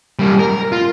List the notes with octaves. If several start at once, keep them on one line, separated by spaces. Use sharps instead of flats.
G3 A#3
A#4
F4